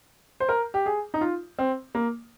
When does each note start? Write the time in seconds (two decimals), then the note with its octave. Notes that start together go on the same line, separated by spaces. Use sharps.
0.40 C5
0.49 A#4
0.74 G4
0.86 G#4
1.14 D#4
1.21 F4
1.59 C4
1.95 A#3